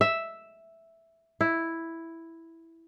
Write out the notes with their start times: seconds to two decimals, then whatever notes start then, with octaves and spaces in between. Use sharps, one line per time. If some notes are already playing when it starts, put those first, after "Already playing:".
0.01 E5
1.41 E4